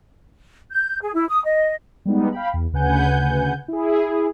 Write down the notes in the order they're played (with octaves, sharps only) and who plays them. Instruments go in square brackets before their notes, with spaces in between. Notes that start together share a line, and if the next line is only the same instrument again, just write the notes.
[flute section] G6
G#4
E4
D#6
D#5
[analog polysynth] G3 G#3 B3 D#4
F5 G5 B5
E2
D2 C#3 B4 F#5 G#5 G6
E4 G#4